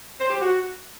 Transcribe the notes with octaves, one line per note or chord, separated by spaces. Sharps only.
C5
G4
F#4